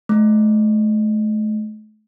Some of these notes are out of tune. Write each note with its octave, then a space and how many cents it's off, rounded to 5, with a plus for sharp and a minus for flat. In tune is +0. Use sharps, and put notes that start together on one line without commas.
A3 -40